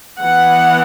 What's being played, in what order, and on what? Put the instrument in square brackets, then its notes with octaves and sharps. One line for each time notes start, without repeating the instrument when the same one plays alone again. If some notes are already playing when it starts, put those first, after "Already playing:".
[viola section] E3 B3 F#5